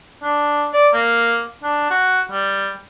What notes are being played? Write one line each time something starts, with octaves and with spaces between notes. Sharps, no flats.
D4
D5
A#3
D4
F#4
G3